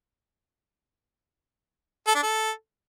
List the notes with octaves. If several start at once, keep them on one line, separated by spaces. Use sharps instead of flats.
A4
D4
A4